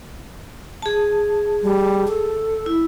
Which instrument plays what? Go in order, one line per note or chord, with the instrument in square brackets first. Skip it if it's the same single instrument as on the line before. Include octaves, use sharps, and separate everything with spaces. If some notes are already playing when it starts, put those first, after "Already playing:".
[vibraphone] G#4 A5
[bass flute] G3
A4
[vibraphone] E4